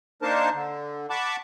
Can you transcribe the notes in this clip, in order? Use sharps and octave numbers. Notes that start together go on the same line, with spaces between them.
A#3 D4 D#4 A#4 C5 A5
D3
F#5 A5 B5 C#6 D6